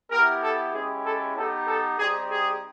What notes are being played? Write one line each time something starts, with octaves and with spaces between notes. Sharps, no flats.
B3 E4 G4 A#4
A4
G#3 C#4 E4 G4 G#4
A4
B3 D#4 G4 A4
A4
G3 C4 D#4 G4 G#4
G#4